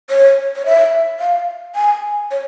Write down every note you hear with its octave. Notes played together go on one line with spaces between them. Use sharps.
C#5
C#5
E5
F5
G#5
C#5